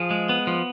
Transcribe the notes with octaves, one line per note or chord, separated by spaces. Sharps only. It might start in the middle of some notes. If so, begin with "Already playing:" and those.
Already playing: F3 G#4
G#3
B3
F3